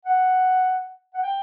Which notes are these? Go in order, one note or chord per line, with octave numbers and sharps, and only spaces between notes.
F#5
F#5
G5